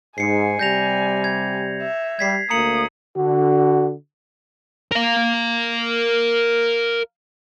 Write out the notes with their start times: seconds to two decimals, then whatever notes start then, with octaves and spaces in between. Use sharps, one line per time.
0.18 G#2 G#5 C7 C#7
0.59 C3 G3 G6 A#6 F7
1.24 G#6
1.82 E5
2.19 G3 G#6 B6 C7
2.50 D2 A#3 A#5 D#6 C#7 F#7
3.17 D3 F#4
4.92 A#4 F5